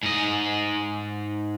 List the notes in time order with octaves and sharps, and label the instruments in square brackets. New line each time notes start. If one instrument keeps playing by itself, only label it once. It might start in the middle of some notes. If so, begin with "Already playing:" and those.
[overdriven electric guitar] G#2 D#5